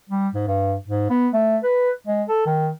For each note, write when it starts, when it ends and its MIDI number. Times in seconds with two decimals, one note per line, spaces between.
0.09 0.28 55
0.34 0.45 44
0.47 0.75 43
0.88 1.07 44
1.10 1.28 59
1.33 1.57 57
1.63 1.90 71
2.07 2.23 56
2.28 2.46 69
2.46 2.70 51